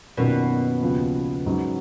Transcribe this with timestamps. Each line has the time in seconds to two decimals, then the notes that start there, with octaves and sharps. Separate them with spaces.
0.17 F#2 B2 D#3 A#3 C#4 F4
0.82 D#2 C#3 F3
1.46 G#2 F#3 C#4